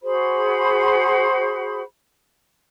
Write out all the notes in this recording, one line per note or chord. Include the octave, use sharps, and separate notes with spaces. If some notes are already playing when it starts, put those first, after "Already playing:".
F#4 G#4 C5 B5